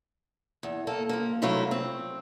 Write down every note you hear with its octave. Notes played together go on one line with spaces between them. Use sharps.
E2
A#3 A4
F3 A#3
C3 D#3 F#3 A3 E4 F4
C4